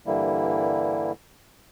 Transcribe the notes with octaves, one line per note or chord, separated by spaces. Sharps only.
G2 D3 E3 G3 A#3 E4